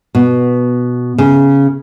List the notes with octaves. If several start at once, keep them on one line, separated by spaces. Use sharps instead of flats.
B2
C#3